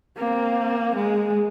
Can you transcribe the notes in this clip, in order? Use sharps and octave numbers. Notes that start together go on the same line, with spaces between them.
A#3 C4
G#3